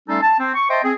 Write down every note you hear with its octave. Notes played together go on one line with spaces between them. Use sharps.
G3 A3 C#4 D#4 F4 A4
A5
C4
C#6
C5 D#5 E5 G5 A5 C6
C4 G#4